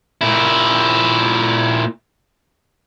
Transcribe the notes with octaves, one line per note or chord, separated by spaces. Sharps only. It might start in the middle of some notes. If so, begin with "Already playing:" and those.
A#2 E4